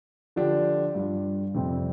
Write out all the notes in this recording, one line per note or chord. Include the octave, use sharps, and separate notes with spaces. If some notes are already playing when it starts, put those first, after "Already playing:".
D3 F3 D4 G4
G2 G3 F4
F2 C3 G3 C4